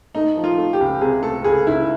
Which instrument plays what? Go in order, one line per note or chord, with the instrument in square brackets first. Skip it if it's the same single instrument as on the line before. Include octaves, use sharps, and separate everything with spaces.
[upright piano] A3 [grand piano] D#4
[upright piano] F3
[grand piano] F4
[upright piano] A3
[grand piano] G4
[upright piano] C#2
[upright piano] C3 [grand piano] G#4
[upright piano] A3 [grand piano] A4
[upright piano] C#2 [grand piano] G#4
[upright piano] C#2 [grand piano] E4